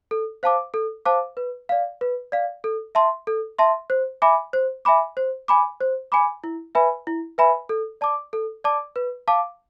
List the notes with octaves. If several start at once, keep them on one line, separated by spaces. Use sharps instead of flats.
A4
C5 F5 A5 D6
A4
C5 F5 A5 D6
B4
D5 F5
B4
D5 F5
A4
E5 A5 C6
A4
E5 A5 C6
C5
E5 G#5 B5 D6
C5
E5 G#5 B5 D6
C5
G#5 B5 D6
C5
G#5 B5 D6
E4
B4 E5 G#5 B5
E4
B4 E5 G#5 B5
A4
D5 A5 D6
A4
D5 A5 D6
B4
F5 A5 D6